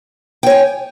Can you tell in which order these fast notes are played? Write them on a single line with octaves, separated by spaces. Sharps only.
G5 C#5 G#5